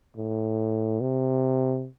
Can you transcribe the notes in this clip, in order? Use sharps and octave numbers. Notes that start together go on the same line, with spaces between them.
A2
C3